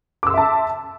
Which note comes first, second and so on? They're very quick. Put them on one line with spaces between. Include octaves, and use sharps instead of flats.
D6 E6 C6 E5 A5